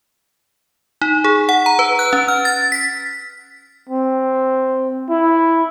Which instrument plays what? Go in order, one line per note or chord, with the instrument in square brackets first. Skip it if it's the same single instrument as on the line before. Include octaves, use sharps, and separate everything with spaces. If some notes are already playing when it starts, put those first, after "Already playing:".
[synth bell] D#4
G#4
F#5
A#5
B4
F#6
C#4
F6
A6
B6
[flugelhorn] C4
E4